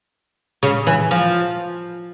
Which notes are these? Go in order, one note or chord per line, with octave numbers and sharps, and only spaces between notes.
C#3
E3
F3